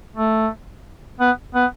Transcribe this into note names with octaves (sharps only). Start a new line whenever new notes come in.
A3
B3
B3